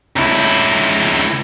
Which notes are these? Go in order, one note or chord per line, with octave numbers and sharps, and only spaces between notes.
C#2 E4